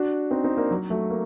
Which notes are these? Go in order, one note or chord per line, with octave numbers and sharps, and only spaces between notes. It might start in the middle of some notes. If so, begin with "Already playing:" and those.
Already playing: D4 F#4
C4 D#4
C4 D#4
A#3 D4
F#3
F#3 A3
A#3